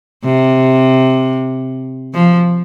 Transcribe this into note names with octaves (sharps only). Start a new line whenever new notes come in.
C3
F3